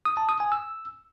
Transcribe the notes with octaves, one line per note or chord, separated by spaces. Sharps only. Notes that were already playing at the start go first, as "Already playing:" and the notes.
D#6
A5
D#6
G#5
E6